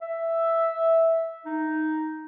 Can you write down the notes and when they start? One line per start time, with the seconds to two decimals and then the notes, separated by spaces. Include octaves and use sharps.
0.02 E5
1.46 D#4